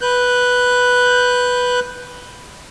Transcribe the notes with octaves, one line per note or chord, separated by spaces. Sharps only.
B4 F#6 G6